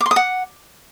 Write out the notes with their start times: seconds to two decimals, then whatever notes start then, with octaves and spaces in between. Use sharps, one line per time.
0.01 D6
0.06 C6
0.11 D#6
0.16 F#5